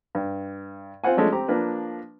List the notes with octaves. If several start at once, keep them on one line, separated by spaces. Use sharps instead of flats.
G2
C4 F4 C5 F#5 G#5
F3 G#3 A3 C#4 D4
C4 G4 A#5
F3 A#3 D4 B4